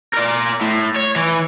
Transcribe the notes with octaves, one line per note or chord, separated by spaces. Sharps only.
A#4 D5
A2
C#5
E3